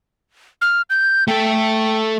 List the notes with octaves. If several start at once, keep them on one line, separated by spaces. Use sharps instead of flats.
F6
G6
A3 A4 G5